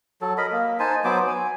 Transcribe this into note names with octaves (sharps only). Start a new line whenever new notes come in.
F#3 A4
A#4 D#5 B5
A#3
D#4 C5 G#5 A5
F#3 B3 C5 D6
G#5